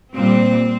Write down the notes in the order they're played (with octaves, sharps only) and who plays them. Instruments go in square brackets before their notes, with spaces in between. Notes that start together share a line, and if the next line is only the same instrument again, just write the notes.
[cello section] A#2 G3 C4